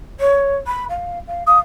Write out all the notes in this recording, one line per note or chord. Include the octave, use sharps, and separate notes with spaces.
C#5
B5
F5
F5
F5 D#6